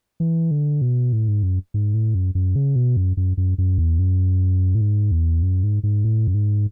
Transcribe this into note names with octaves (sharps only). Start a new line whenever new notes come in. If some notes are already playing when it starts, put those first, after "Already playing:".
E3
D3
B2
A2
G#2
F#2
G#2
A2
F#2
F#2
C#3
B2
F#2
F#2
F#2
F#2
E2
F#2
A2
G#2
E2
F#2
G#2
G#2
A2
F#2
G#2